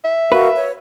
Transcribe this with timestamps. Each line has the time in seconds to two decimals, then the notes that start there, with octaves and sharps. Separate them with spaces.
0.04 E5
0.32 F#4 A#4 B4 F5
0.56 C#5